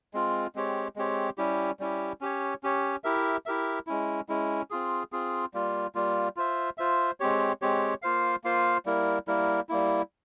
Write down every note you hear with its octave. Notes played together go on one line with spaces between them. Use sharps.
G#3 C4 F4
G#3 C4 G4 C#5
G#3 C4 G4 C#5
G3 C#4 E4 G4
G3 C#4 E4 G4
C#4 G4 C#5
C#4 G4 C#5
E4 G4 A#4 E5
E4 G4 A#4 E5
G#3 C#4 E4
G#3 C#4 E4
C4 F4 G#4
C4 F4 G#4
G3 A#3 F4
G3 A#3 F4
F4 C5 E5
F4 C5 E5
G#3 C4 G4 C#5
G#3 C4 G4 C#5
A#3 F4 C5 F5
A#3 F4 C5 F5
G3 A#3 E4 A#4
G3 A#3 E4 A#4
G3 A#3 E4